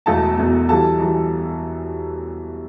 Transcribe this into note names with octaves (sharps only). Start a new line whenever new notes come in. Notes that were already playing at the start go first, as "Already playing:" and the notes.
E1 E2 B2 A3 A4 A5
E1 E2 B2 A3
F#2 E3 G3 A4 A5
F#2 E3 G3